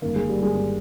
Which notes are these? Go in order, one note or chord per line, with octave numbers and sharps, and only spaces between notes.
G1 G2 D#3 A#3
G#3
G3
G#3
G2 D#3